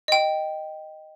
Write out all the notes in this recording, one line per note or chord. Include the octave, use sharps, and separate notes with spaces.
D#5 G5